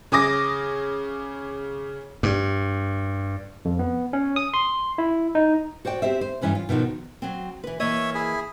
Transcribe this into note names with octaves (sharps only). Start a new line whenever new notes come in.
C#3 G#4 D6 D#6 A#6
G2
F2
B3
C#4
D#6
C6
E4
D#4
F#4 C5 D5 G5
C4 G4 C5 E5
C5
G2 C3 E3 C#4 B4
F4
B2 D#3 F3 F#4
F#3 C4
E3 B4
E3 A#3 C#5 D#5 E5
E4 G#4